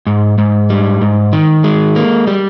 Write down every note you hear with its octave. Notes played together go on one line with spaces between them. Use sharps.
G#2
G#2
G3
G#2
D#3
G#3
A#3
G3